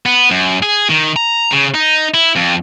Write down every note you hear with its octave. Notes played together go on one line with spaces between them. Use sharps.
B3
F#2
G#4
D#3
A#5
C#3
D#4
E4
F2